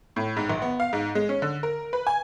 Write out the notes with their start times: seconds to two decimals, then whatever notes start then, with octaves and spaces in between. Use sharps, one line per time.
0.16 A2
0.37 G#2
0.50 A#1
0.62 B3
0.80 F5
0.93 G#2
1.15 G#3
1.29 C#4
1.42 D3
1.63 A#4
1.93 B4
2.07 G#5